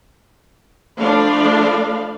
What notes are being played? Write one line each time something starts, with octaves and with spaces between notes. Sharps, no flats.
F3 A3 D4 F5 B5